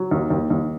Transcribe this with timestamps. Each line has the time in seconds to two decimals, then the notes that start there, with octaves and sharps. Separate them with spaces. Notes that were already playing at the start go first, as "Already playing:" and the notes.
Already playing: F#3
0.11 D#2
0.30 D#2
0.50 D#2